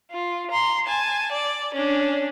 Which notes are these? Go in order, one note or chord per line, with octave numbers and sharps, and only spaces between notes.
F4
A#5 C6
G#5 A5
D5
C#4 D4